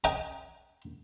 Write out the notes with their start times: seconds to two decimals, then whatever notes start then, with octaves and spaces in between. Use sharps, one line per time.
0.04 D#5 G5 G#5 A#5